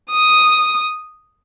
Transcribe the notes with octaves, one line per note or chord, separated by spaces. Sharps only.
D#6